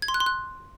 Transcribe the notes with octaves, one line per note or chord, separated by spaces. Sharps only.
G#6
C6
F#6
C6
F#6